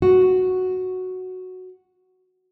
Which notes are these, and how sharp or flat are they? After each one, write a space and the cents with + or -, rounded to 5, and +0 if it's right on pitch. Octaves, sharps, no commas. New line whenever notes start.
F#4 +0